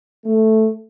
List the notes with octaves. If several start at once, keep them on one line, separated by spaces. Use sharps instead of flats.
A3